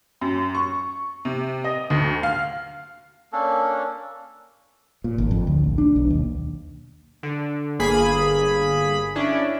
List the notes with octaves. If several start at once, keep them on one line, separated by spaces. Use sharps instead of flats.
F#2
C#6
C3
D#5
D2
F5
A#3 C#4 D4 A4
A#2
G#1
F2
D2
A#1
D4
B1
D#2
D3
G1 A#3 G#4 B5
C#4 D4 E4